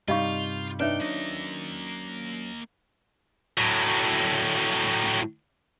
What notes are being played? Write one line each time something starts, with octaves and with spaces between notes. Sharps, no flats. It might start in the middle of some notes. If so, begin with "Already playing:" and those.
G2 C3 G3 D#4 F4 D#5 F5 C#6
D4 D#4 B4 C#5 E5 G5
F#3 A#3 C#4 D#5
A2 F#3